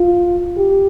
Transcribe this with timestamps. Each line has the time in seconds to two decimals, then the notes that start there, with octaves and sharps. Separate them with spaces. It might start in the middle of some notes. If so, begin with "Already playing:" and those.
Already playing: F4
0.57 G4